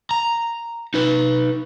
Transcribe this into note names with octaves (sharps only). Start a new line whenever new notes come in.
A#5
D#4 B4